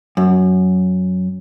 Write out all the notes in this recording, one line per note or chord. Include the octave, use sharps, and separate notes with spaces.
F#2